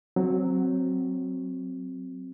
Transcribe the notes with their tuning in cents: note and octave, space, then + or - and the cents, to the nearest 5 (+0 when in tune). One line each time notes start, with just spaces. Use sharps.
F#3 +0 C4 +0